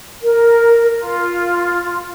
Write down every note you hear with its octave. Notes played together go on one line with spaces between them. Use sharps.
A#4
F4